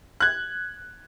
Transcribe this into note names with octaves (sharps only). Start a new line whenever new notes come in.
F#6 G#6